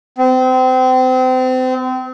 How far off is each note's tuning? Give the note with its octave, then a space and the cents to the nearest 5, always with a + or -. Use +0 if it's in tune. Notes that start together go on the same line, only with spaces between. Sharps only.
C4 -30